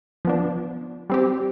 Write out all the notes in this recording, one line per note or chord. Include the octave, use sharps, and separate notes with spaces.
F3 B3 D4
G3 C4 G4